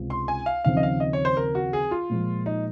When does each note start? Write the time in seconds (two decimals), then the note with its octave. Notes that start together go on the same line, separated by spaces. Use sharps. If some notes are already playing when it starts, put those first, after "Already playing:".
Already playing: C#2 C3
0.10 C6
0.28 G#5
0.46 F5
0.65 D#2 C#3 F3 C4 F5
0.77 D#5
0.83 F5
1.00 D#5
1.13 C#5
1.25 C5
1.37 A#4
1.55 F#4
1.73 G#4
1.91 F4
2.10 A#2 F3 G#3
2.46 D#4